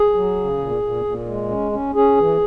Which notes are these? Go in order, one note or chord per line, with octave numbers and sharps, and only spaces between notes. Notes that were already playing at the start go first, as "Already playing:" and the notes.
Already playing: G#4
F#3
C#3
A#2
A#2
A#2
G#3
C#4
C#4
C#4 G#4
E3